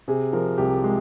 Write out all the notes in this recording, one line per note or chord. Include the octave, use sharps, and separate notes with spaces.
C3 G#4
F3 A#4
C2 G4
G#3